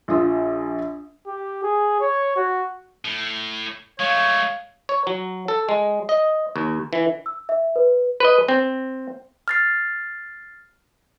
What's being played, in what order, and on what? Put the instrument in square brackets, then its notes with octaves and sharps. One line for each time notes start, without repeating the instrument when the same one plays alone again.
[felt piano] A#1 F4 D#6 E6
[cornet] G4
G#4
C#5
F#4
[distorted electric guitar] A2
[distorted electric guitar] G#3 A3 [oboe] C#5 [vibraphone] F5
[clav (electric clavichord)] C#5
F#3
A4
G#3
D#5
D#2
E3
[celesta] E6
E5
B4
[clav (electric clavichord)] B4 D#5
C4
[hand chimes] F6 A6 C7